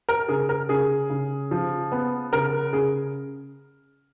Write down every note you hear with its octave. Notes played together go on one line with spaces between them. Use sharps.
A#4
C#3 G#4
A#4
C#3 G#4
C#3
F3
B3
C#3 A#4
C#3 G#4